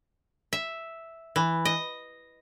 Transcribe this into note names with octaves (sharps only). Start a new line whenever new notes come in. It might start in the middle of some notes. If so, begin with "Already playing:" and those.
E5
E3
D#5